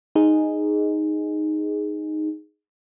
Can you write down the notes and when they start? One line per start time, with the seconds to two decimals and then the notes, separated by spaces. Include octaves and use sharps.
0.16 D#4 G#4